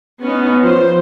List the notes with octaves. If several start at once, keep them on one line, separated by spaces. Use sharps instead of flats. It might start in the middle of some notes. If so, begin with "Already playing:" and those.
B3 C#4 D#4
F3 C5